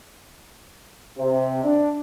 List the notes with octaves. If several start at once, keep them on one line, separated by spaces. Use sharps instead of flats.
C3
D4